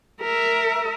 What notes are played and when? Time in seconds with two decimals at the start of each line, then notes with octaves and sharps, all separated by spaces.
0.21 A#4 E5